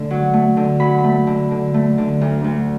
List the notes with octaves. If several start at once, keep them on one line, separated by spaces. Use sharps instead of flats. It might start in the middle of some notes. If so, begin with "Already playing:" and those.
Already playing: D3 A3
F#3
A3
D3
F#3 B5
B5
A3
D3
D3
A3
D3
D2
D2